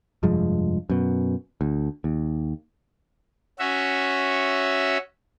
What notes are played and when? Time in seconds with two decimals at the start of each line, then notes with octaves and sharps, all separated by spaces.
0.23 F1 G2 F3 G#3
0.90 F#2 B2
1.61 D2
2.04 D#2
3.59 C#4 F#4 E5